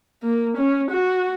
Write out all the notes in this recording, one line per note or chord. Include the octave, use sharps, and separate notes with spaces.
A#3
C#4
F#4